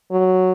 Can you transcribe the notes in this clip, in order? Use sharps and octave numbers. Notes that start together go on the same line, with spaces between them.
F#3